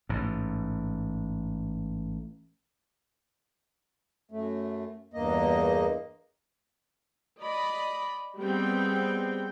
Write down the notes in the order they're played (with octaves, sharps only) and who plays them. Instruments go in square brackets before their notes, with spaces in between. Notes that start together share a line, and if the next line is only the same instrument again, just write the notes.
[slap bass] A1 G#2
[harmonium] F#2 A3
E2 G2 A#3 D#5
[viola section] D5 D#5 B5
G3 G#3 B3 C4 G5